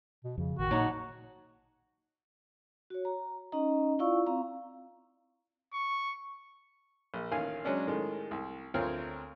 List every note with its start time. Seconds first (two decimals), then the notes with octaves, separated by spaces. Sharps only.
0.24 B2
0.38 F2 C#3
0.59 A1 D#3 F#4
0.71 A#2 F#3 D4 D#4 C#5
2.90 F#4 C#5
3.05 A#5
3.52 C#4 D#4 D#5 A#5
3.99 E4 F4 D5 F5 C#6 E6
4.26 C4 F5 A#5
5.73 C#6
7.14 A#1
7.32 A1 D#3 F5 G#5
7.65 F#3 G#3 C#4 D4
7.87 A2 D#3 G#3 A3
8.31 C2
8.74 D2 C4 F4 A#4 C#5 F6